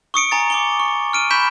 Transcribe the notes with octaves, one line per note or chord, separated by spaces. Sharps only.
C#6 D#6 C#7 D7
G#5 A#5 A6
D6 C#7 G7
C#6
F6 D7 D#7
B5 C#6 G6 B6 E7